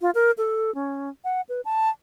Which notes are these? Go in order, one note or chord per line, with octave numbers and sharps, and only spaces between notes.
F4
A#4
A4
C#4
F#5
B4
A5